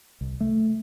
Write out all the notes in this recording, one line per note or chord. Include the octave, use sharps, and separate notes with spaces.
C2
A3